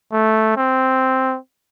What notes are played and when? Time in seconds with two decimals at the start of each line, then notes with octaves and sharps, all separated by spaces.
0.12 A3
0.57 C4